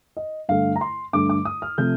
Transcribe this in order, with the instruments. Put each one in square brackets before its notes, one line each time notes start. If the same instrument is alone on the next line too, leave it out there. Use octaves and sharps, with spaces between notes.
[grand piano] D#5
G2 D3 A3 F5
A#5
C6
G2 D3 A3 D6
D6
D#6
F6
C3 F3 A3 G6